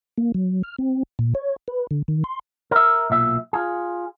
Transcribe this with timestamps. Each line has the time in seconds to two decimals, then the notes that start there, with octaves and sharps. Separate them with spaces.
0.18 A#3
0.34 F#3
0.63 F6
0.79 C4
1.19 A#2
1.35 C#5
1.68 B4
1.91 D3
2.08 D#3
2.24 C6
2.71 A#4 E5
3.10 B1 A#2 E5
3.53 F4 G#4